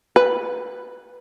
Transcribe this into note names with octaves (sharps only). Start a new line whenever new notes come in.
B4